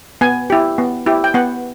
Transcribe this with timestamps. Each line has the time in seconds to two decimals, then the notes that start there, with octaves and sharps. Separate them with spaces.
0.21 B3 G#5
0.50 E4 G4
0.78 B3
1.06 E4 G4
1.24 G5
1.34 B3 F#5